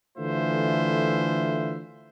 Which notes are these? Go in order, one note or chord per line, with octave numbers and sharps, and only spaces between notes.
D3 E3 A3 F4 C5 E5